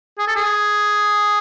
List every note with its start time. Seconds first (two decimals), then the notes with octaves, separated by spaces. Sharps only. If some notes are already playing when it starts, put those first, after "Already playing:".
0.18 G#4
0.27 A4
0.36 G#4